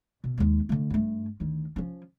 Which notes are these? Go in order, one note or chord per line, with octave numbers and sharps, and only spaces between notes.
B2
D#2 G#3
D3 A3
G2 A3
D2 D#3
F3 C#4